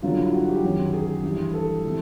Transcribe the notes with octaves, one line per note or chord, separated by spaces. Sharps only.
G2 D3 F#3 F4
E4
F#4
G4
F#2 D#3 F#3
G#4
G2 E3 G3
A4
C3 E3 G#3